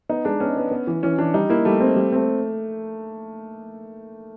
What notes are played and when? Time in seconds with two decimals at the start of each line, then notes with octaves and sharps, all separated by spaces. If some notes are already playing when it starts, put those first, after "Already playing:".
0.09 B3 D#4
0.25 G#3 D4
0.40 B3 C#4
0.57 B3
0.71 B3
0.87 E3
1.03 E3 C#4
1.18 E3 D4
1.34 G3 D#4
1.49 A#3 E4
1.65 G3 A3
1.81 C4
1.96 G3
2.12 A3 C4